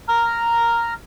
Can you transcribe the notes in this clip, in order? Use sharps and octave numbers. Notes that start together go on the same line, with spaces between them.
A#5 F6